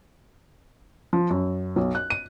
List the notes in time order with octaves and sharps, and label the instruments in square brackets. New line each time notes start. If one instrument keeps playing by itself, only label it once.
[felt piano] F3
F#2
B1
F#6
D#7